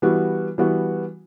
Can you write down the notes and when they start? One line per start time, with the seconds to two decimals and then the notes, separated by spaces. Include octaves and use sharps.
0.02 E3 G3 B3 F#4
0.58 E3 G3 B3 F#4